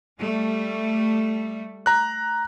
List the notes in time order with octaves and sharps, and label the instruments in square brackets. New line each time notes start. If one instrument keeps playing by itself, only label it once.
[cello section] G3 A3
[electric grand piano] A#5 F#6